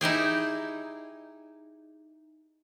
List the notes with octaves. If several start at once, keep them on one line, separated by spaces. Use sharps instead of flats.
D#4 E4 G4 G#4